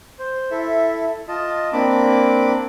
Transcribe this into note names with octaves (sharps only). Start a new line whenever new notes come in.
C5
E4 A4 E5
F4 D#5 A5
A#3 C4 D4 B5 D6